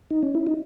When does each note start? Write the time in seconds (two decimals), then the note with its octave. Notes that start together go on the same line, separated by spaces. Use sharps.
0.11 D#4
0.23 C#4
0.35 E4
0.47 D#4